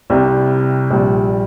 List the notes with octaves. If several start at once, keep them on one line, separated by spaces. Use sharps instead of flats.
C2 C3 G3
A#1 A#2 G3